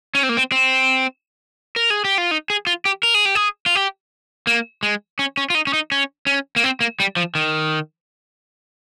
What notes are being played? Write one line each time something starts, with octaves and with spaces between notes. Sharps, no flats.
C#4
C4
A#3
C4
C4
A#4
G#4
G4
F4
D#4
G#4
F4
G4
A#4
G#4
G4
G#4
F4
G4
A#3
G#3
C#4
C#4
F4
D#4
C#4
D#4
C#4
C#4
A#3
C4
A#3
G3
F3
D#3